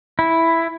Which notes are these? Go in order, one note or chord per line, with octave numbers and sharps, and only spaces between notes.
E4